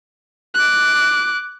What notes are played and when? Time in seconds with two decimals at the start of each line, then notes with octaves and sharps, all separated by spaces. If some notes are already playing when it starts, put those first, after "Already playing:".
0.55 D6 F#6